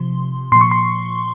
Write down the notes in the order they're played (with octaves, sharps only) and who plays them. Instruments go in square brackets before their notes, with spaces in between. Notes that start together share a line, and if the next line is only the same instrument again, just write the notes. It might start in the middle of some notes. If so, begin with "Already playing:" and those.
Already playing: [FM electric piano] C3 F3 C6
A#2 F3 C6
C#6
C6